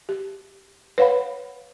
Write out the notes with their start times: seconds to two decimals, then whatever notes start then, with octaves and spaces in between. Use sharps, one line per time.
0.09 G4
0.98 B4 C#5 F5 F#5 B5